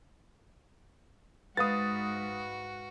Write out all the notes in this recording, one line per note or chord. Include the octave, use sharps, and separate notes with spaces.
G#2 F#4 B4 F5 D#6 A6